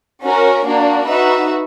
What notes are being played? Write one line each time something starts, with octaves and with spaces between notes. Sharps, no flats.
C#4 F#4 A#4
A#3 D4 F#4
D#4 F#4 B4 E5